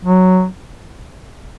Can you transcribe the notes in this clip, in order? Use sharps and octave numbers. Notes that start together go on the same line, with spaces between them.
F#3